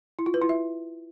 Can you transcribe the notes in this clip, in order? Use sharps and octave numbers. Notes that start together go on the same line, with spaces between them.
E4
F4
B4
E4
E5